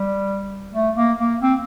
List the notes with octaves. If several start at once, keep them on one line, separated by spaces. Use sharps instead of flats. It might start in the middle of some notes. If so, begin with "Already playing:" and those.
Already playing: G3
A3
A#3
A#3
C4